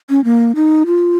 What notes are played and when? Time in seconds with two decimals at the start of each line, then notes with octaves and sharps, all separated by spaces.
0.10 C#4
0.24 A#3
0.55 D#4
0.86 F4